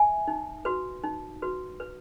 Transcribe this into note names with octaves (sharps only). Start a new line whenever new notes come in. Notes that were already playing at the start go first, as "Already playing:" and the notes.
Already playing: E5 G#5
D#4
F#4 B4
D#4
F#4 B4
B4